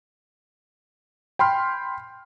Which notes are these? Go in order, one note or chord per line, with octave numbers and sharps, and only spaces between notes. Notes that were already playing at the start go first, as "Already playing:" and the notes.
G5 B5 C6 F6 G6